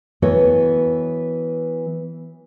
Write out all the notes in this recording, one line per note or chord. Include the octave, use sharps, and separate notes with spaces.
E3 B3 F#4 A4 C#5